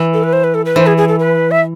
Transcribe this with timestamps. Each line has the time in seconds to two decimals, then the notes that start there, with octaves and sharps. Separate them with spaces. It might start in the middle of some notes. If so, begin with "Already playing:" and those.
Already playing: E3
0.14 A4
0.23 B4
0.33 C5
0.44 B4
0.54 A4
0.65 B4
0.76 E3 C5
0.87 G#4
0.97 G#4
1.08 A4
1.20 B4
1.51 E5